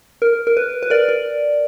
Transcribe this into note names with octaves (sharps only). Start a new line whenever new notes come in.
A#4
A#4
B4
B4
A#4 D5
A#4